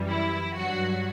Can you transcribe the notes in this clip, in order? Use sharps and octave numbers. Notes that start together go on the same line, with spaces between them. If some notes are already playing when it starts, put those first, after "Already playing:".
Already playing: F#2 E3 G3
E4
G2 F#3 F#4